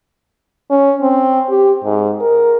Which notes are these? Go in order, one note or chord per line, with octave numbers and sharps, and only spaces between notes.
C#4
C4
G4
G#2
A#4